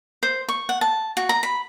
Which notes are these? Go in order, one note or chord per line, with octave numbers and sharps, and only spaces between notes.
C5
C#6
F#5
A5
F#4
A#5
B5